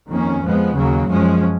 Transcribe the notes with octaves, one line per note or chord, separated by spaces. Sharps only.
F2 D#3 A#3 C#4
F2 F3 G#3 B3
D#2 C#3 F#3 A#3
F#2 F3 G#3 C#4